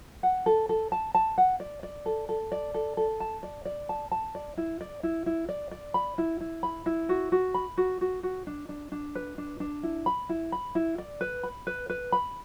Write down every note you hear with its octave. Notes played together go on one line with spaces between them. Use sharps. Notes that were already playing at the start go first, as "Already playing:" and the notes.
F#5
A4
A4
A5
A5
F#5
D5
D5
A4
A4
D5
A4
A4
A5
D5
D5
A5
A5
D5
E4
D5
E4
E4
D5
D5
B5
E4
E4
B5
E4
F#4
F#4
B5
F#4
F#4
F#4
D4
D4
D4
B4
D4
D4
E4
B5
E4
B5
E4
D5
B4
B5
B4
B4
B5